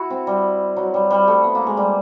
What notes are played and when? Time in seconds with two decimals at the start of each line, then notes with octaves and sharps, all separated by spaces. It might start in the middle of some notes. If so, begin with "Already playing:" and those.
Already playing: E4 F#4
0.10 C4
0.27 G3
0.77 F#3
0.94 G3
1.11 G3
1.28 A3
1.44 B3
1.55 A#3
1.67 G#3
1.77 G3